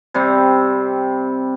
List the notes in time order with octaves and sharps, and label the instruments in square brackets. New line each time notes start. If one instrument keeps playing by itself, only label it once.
[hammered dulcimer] C3 G3 C4